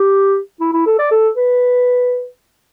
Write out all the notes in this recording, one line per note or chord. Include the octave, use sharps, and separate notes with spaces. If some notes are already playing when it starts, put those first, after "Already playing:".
Already playing: G4
E4
E4
A4
D5
A4
B4